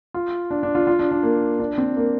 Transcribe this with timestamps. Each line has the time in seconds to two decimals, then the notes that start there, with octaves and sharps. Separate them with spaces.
0.14 F4
0.51 D4
0.63 D4
0.75 F4
0.87 F4
0.99 D4
1.11 D4
1.23 A#3
1.60 D4
1.78 C4
1.97 A#3